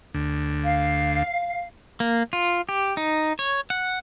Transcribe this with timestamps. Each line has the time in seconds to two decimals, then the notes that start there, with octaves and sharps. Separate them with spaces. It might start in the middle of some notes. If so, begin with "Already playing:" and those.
0.14 D2
0.63 F5
2.00 A#3
2.33 F4
2.69 G4
2.97 D#4
3.39 C#5
3.70 F#5